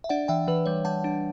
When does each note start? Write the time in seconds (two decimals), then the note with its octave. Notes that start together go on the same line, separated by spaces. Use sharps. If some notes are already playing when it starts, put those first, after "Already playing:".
0.04 E5
0.09 D4 D5 F#5
0.28 E3 E5 G5
0.48 E3 B4
0.66 G3 C#5
0.85 G3 F#5 A5
1.04 D4